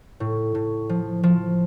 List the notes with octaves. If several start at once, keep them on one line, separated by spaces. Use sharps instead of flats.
A2
A2
F3
F3